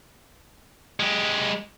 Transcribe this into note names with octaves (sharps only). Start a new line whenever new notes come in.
G#3 G4